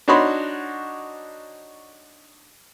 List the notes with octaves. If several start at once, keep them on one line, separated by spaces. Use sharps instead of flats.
D4 D#4 F#4 C#5 B5 C6